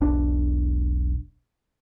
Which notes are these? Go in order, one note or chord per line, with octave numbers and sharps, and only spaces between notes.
E1 B1 D4